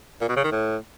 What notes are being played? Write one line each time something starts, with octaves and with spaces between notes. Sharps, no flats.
A#2
B2
C#3
D#3
A2